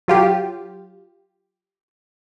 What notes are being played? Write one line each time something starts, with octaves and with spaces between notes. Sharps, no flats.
F#3 F4 G4